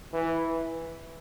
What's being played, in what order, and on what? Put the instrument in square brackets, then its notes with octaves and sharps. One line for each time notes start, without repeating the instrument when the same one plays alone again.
[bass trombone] E3